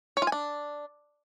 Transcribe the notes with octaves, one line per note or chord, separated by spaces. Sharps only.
C#5
F4
G#5
D4